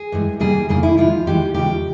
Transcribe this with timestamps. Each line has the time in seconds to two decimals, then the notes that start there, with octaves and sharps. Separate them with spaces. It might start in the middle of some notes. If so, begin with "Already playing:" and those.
Already playing: G#4
0.12 G2 E3 G#3
0.40 C3 G3 A#3 G#4
0.69 F2 C#3 G3 A#3 G#4
0.83 E4
0.97 C3 F3 G#3 F4
1.26 C3 E3 G#3 G4
1.54 E2 C#3 F3 G#3 G4